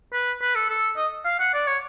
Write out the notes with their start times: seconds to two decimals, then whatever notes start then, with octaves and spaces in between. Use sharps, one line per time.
0.13 B4
0.42 B4
0.55 A4
0.69 A4
0.97 D#5
1.25 F5
1.40 F#5
1.54 D5
1.67 C#5